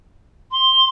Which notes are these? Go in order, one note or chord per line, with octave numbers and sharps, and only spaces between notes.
C6